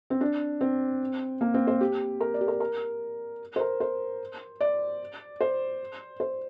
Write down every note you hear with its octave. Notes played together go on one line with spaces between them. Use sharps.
C4
D4
C4
A#3
C4
C5
G4
A#4
D5
G4
A#4
A#4
C5
A#4
C5
D5
C5
C5